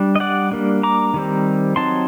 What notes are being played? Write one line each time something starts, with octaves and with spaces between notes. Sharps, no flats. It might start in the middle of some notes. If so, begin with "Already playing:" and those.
Already playing: G3 D4
D#5
D5 F#5
G3 A#3 D4
A#5 D6
D#3 G3 C4
F#3 C4 D#4 A5 C6